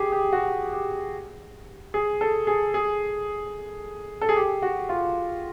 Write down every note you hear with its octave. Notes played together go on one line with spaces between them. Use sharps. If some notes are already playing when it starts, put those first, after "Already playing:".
Already playing: G4 G#4
G4
F#4
G4
G#4
A4
G#4
G#4
A4
G#4
G4
F#4
F4